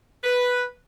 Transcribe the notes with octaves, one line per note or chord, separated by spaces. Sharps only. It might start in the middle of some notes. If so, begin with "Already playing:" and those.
B4